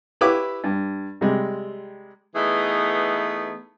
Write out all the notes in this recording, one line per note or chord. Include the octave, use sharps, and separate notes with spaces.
E4 G4 B4 C#5 D6
G2
C3 G3 G#3
E3 A3 B3 D#4 G#4